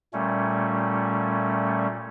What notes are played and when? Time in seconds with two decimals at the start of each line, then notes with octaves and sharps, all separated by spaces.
0.13 A#2 G3 A3 C#4